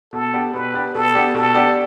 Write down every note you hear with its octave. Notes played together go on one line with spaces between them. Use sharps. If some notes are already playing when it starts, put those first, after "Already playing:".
B2 A4
B3 D4 G4 D5
B2 B4
B3 D4 G4 D5
B2 A4
B3 D4 G4 D5
B2 A4
B3 D4 G4 D5